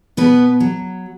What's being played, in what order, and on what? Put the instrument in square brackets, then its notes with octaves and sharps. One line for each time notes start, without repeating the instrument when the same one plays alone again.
[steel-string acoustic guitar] B2 B3 B4
F#3